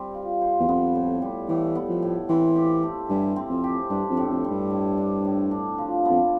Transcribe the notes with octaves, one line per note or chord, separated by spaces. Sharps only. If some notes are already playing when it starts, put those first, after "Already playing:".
Already playing: G3 C4
F4
C5
E2
F2 B3
A2
G3
A2 E3
B3
F3
A2
E3 C4
G4
A3
G2 E3
C4
F2
G4
G2 D4
F2
A2
F2
G3
G2
A2
D4
A2
D4
F3
B3
F2